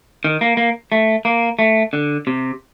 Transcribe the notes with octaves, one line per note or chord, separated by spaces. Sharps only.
D#3
A#3
A#3
A3
A#3
A3
D3
C3